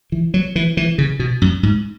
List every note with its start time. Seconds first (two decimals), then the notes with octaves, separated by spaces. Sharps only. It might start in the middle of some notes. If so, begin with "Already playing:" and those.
0.12 E3
0.34 F#3
0.56 E3
0.77 E3
0.98 C#3
1.19 B2
1.42 F#2
1.63 G#2